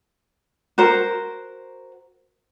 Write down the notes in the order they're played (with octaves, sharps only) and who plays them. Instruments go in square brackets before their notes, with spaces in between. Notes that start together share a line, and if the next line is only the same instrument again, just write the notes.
[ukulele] F#4 A#4 C5